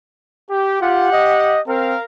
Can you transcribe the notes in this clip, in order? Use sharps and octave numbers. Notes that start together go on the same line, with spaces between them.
G4
F4 G4 F#5
D#5
C4 A#4 F5